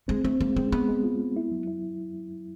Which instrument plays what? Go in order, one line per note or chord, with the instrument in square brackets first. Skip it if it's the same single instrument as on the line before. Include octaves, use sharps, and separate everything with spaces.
[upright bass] G#3 [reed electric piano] C4
[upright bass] A3 [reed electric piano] C4
[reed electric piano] G#3 [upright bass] A#3
[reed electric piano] G#3 [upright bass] C4
[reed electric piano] G#3 [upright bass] B3
[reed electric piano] G#3
F4
G#3
E4
F#3
E4